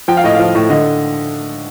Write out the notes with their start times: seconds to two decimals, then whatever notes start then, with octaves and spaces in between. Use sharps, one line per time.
0.08 F3 G5
0.17 F5
0.24 A2 D#5
0.35 F3 F5
0.55 A2
0.69 D3 D#5